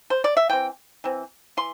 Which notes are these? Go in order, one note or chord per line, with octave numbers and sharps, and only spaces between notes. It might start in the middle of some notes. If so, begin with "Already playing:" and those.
C5
D5
E5
E3 C4 G5
E3 C4
E3 C6